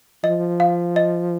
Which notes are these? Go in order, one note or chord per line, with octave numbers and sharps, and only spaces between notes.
F3 D#5
F5
D#5